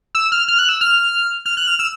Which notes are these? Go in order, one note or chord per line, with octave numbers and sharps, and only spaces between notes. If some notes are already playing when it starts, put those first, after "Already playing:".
E6
F6
F6
F#6
E6
F6
F6
F#6
F6
E6